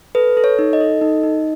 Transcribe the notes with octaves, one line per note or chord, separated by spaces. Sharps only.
A4 B4
A4
C#5
D#4
D#5
A4
D#4
D#4